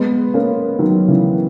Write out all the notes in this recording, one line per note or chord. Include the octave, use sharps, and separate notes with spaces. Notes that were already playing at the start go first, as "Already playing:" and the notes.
Already playing: G#3 B3
A#3 C#4
D#3 F#3
C#3 E3